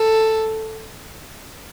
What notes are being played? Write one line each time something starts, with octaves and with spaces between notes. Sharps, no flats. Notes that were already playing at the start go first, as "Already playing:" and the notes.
Already playing: A4